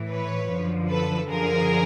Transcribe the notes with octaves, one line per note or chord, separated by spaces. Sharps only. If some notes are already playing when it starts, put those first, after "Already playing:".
Already playing: A2 E3
B4 C#5
F#2 D3 F3
A4 B4
F#2 D3 F3 G#4 A#4